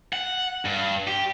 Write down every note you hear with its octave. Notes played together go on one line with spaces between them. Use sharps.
F#5
G2
G4